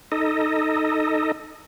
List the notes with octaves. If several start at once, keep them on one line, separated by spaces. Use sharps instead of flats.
D#4 A4 D#5